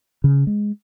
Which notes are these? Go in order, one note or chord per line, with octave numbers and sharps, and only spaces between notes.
C#3
G#3